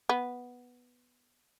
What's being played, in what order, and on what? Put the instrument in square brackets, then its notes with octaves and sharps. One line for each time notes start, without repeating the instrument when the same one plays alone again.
[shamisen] B3